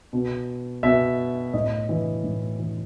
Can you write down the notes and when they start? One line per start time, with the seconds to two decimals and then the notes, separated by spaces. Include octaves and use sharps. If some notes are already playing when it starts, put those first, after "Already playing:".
0.13 B2
0.83 B2 E5
1.54 A2 D#5
1.89 E3
2.24 A2
2.60 E3